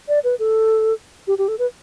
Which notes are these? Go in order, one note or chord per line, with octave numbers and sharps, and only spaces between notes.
D5
B4
A4
G4
G4
A4
B4